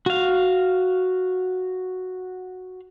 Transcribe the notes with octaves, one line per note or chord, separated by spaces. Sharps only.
F#4 F5